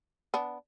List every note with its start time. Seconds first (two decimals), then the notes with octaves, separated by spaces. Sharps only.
0.34 B3 D4